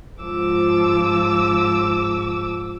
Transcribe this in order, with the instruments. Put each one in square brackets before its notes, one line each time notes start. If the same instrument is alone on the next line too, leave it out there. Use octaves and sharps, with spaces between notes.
[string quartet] G#2 F3 D6 E6